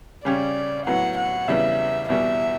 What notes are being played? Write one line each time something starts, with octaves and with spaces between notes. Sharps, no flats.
C#3 G3 C#4 G4 D5
A2 F#3 B3 F#5
F#5
E2 C#3 G3 B3 E4 E5
E2 B2 G3 B3 E5